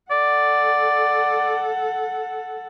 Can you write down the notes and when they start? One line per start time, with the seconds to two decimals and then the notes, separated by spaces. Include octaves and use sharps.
0.11 A4 D5 F#5